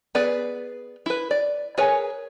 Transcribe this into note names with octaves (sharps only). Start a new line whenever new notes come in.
B3 G#4 B4 D5
E4 B4
D5
G#4 A#4 B4 C#5 G#5